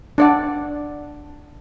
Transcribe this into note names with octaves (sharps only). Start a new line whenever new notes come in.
D4 D5 F#5